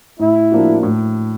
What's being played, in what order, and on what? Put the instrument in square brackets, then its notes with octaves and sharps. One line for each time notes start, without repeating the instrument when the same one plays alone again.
[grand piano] A2 [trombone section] E4
[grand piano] F3 A#3 D4 F#4
A2